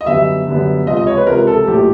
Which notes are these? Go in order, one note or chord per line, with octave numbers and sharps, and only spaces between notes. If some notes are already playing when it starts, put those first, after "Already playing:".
D#5
F#2 D3 G3 B3 E5
F#2 D3 G3 B3
C#2 C3 F3 D#5
D#5
C#5
B4
C#2 C3 F3 A#4
A4
A#1 A2 F#3 A#3 G4